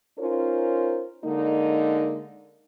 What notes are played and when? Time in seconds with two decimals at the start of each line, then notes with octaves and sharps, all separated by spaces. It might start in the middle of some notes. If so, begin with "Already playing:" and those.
0.19 C#4 D#4 F4 A#4 C5
1.25 D3 G#3 A#3 D#4